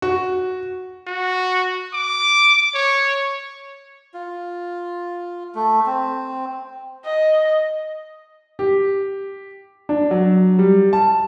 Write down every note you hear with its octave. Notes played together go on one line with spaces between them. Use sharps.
F#4
F#4
D6
C#5
F4
A3
C4
D#5
G4
D4
F#3
G3
A5